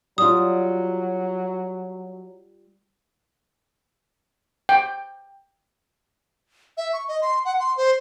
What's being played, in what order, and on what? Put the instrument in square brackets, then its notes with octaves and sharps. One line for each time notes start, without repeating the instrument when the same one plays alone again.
[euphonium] F#3 [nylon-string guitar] G3 F4 [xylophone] D#6
[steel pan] G5
[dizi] E5
C#6
D#5
C6
F#5
C6
C5